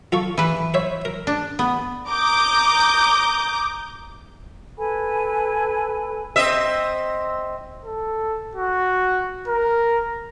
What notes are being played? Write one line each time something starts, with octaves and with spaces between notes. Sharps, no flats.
F4 A4 C#6
E3 B4
C5 C#5 E5
A#4
D4
B3
A#5 D6 D#6 G6
A4 B4 G#5 B5
C4 D#5 E5
A4
F#4
A#4